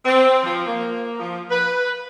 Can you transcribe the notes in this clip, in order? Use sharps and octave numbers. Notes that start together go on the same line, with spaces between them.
C4
F3
A#3
F3
B4